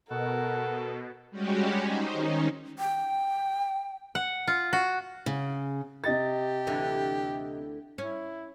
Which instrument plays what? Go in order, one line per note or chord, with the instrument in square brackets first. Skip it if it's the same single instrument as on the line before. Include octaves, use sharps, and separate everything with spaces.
[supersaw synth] B2 [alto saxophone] A4 [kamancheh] A#4 [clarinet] F#5
[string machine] G3 G#3 C#4 F#4 G4
D#4 C5
D#3 C#4 D#4
[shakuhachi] G5
[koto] F#5
F4
F#4
[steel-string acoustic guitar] C#3
[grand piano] C3 D#5 A6 [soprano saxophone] G4
[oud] D2 D3 E3
[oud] C#4 [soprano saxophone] E4